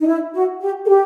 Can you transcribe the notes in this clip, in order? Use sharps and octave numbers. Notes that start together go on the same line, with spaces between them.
D#4
E4
F#4
G4
A4
G4